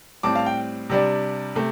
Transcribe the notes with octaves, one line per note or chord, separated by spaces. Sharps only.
A2 G3 C4 A5 D6
F5 A5
G5
C3 G3 D4
C3 A3